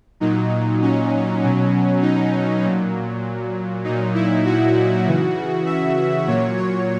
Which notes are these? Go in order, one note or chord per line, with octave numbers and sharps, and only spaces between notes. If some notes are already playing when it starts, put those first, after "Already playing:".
A#2 F#3 D#4
C#4
B2 F#3
D#4
A#2 F#3
A#2 F#3 D#4
E4
F#4
C#3 E3
E5
A#2 F#3 C#5
C#5